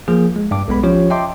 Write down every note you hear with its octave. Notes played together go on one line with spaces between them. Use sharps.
F3 A#3 G#4
G#3
G2 D6
B1 G#3 B3 B5
F3 C#4 F4 G4 C#5
D#5 E5 G5 A5 C6 D6